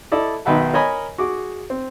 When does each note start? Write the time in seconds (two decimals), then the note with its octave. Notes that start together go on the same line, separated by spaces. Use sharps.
0.12 E4 A4 D5 D#5
0.45 B1 D#3 B4 E5 F#5 A5
0.73 A#4 C#5 D#5 G#5 B5
1.18 F#4 G#4 D6
1.70 C4